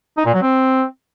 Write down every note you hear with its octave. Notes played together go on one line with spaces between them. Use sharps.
D#4
A#2
F#3
C4